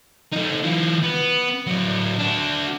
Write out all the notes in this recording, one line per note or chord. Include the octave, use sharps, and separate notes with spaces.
A3 D#4
E3 F4
B3
A2 F#3
D4 F#4